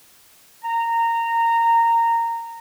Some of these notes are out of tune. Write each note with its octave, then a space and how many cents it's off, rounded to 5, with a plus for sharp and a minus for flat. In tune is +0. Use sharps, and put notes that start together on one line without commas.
A#5 -15